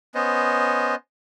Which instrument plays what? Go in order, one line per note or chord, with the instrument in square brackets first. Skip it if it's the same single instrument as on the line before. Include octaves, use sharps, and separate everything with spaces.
[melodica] B3 C#4 C5 D#5